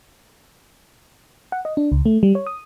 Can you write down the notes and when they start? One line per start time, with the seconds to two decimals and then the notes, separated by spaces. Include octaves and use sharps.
1.52 F#5
1.65 D#5
1.77 D4
1.92 C#2
2.06 A3
2.23 G3
2.35 C#5
2.46 D#6